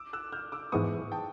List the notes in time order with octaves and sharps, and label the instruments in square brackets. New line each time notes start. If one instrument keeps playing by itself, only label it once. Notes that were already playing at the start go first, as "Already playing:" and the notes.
Already playing: [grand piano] D6 E6
E6 F#6
F6 G6
D6 E6
[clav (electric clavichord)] G#2 E3 G#3 B3 [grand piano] C#6 D#6
[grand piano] G5 A5